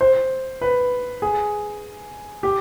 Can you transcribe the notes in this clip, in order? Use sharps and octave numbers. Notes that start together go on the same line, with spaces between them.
C5
B4
G#4
G4